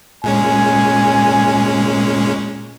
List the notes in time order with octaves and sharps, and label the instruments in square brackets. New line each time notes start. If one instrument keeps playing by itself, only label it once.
[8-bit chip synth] A#2 G#3 C#4 [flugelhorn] G#5